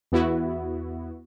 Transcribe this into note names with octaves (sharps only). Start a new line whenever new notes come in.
E2 B3 E4 F#4